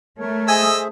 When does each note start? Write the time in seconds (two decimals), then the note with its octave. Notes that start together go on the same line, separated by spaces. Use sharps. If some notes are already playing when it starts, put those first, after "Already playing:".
0.19 A3 A#4 C#5
0.48 G#4 C5 D#5 E5 G#5 E6